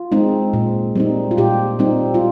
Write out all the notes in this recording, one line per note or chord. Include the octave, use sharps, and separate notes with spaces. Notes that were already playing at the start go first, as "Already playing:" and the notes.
Already playing: F4
G#3 C4 D#4
A#2
G3 C4 D#4
F4
A#2 G4
G3 C4 D#4
F4